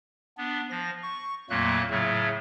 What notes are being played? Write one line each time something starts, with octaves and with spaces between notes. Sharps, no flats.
B3 D4
F3 A#6
C#6
F2 A#2 F#3 A3 A#3 F#6
A2 C#3 F#3 A3